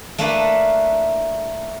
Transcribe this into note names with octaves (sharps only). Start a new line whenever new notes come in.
A3 A#3 D4 E4 B4